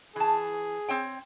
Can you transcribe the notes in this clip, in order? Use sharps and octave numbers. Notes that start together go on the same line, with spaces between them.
E3 G#4 A5
C4 C#5 G5